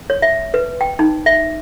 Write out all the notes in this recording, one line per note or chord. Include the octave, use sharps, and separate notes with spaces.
C#5
E5
B4
G5
D#4
E5